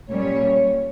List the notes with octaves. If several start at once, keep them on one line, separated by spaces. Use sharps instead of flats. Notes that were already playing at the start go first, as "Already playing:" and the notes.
A#2 G3 C#4 C#5